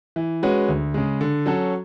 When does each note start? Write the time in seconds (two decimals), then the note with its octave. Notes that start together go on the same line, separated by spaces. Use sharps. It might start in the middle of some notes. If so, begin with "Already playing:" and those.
0.16 E3
0.43 G#3 C#4 F#4 B4
0.69 D2
0.94 C#3 G#3
1.21 D3
1.46 F#3 C#4 F#4 A4